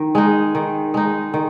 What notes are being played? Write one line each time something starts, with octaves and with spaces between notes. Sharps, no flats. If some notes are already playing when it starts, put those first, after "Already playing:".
Already playing: D#3
G#3 D#4
D#3
G#3 D#4
D#3